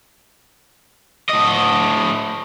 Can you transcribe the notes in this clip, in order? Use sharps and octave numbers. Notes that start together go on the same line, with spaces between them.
A2 D#5